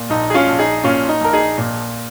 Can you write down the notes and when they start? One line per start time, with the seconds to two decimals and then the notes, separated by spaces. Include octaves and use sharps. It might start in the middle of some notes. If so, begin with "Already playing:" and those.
Already playing: A#2
0.10 A#1 D#4
0.30 G#4
0.34 C#4 F4
0.47 A#1
0.59 D#4 G#4
0.84 A#2 C#4 F4
1.09 D#4
1.21 A#1 A#4
1.33 D#4 G#4
1.58 A#2